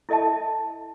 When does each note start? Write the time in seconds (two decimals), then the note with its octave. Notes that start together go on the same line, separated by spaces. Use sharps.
0.09 E4 A4 D#5 E5 A5